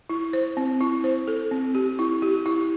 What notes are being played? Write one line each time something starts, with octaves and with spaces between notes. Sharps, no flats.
E4
C5
C4
E4
C5
A4
C4
G4
E4
G4
E4